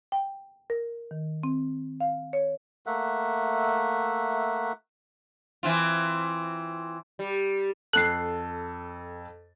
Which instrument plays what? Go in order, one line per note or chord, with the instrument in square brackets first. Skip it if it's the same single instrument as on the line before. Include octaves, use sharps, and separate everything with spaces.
[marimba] G5
A#4
D#3
C4
F5
C#5
[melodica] A3 A#3 E5 F#5
[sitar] E3 C4 F4
G3
[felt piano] F2 A4 [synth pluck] F#6 C7